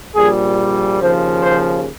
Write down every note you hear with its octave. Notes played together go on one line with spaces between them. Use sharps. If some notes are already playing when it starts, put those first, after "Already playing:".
A#1 A#2 G3 G#4
D#2 C#3 F3 C5
C5